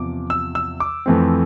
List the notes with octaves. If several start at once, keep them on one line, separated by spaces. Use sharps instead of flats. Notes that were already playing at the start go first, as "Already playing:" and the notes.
Already playing: E2 C3 F3 D6
E6
E6
D6
F2 E3 A3 C4